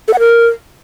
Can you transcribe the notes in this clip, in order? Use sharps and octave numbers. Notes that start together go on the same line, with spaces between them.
A4
F#5
A#4